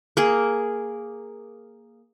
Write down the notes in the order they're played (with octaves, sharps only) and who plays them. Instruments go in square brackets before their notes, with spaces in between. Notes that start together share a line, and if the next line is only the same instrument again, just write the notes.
[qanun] A#3 G#4